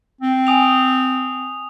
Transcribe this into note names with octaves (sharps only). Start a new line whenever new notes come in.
C4
G#5 D#6 F7